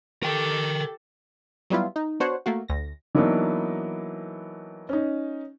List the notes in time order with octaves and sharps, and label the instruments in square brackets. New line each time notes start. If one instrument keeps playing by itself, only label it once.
[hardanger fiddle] G4 A4 [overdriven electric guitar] A#4 G5
[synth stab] F#3 G3 B3 E4 F4
D#4
B3 D4 F#4 C5 C#5 F#5
A3 A#3 F#4
D2 A#6
[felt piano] E3 F#3 A#3 B3 D4 D#4
C#4 D#4